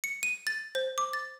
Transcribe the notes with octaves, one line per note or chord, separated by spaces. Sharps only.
C#7
D#7
A6
C5
D6
A6